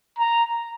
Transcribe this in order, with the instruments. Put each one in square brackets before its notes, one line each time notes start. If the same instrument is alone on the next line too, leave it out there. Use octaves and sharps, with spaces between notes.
[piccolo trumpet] A#5